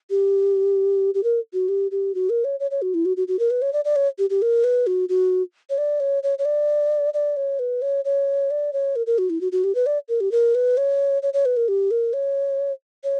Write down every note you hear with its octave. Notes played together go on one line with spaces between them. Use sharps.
G4
G4
A#4
F#4
G4
G4
F#4
A#4
C#5
C#5
C#5
F#4
E4
F#4
F#4
F#4
A#4
B4
C#5
D5
D5
C#5
G4
G4
A#4
B4
F#4
F#4
C#5
D5
C#5
C#5
C#5
D5
D5
C#5
B4
C#5
C#5
D5
C#5
A#4
A#4
F#4
E4
F#4
F#4
G4
B4
D5
A#4
G4
A#4
B4
C#5
C#5
C#5
B4
A#4
G4
A#4
C#5
C#5